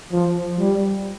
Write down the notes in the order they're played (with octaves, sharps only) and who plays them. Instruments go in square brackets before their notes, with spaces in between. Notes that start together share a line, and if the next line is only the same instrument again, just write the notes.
[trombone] F3
G3